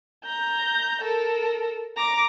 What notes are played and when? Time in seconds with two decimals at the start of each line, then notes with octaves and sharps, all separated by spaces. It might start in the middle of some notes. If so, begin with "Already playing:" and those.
0.25 A#5 G6
1.02 A4 A#4
1.96 A#5 D6